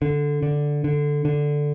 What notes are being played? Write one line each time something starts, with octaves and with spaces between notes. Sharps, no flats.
D3
D3
D3
D3